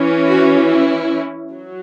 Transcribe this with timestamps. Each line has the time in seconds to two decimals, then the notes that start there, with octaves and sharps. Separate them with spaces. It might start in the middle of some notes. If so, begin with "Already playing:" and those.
Already playing: E3 C#4
0.27 F#4
0.68 E4
1.52 F#3